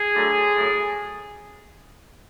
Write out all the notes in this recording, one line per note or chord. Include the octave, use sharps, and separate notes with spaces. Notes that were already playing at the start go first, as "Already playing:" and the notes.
Already playing: G#4
D3 F#3 A3
A2 F#3 A3